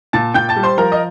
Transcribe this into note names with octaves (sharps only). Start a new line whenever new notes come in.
A#2 A5 A6
A#2 G5 G6
A5 A6
G3
C5 C6
F3 A#4 A#5
D#5